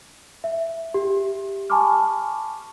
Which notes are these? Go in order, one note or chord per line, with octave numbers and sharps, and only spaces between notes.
E5
G4
G#5 A5 B5 C#6 D6 F6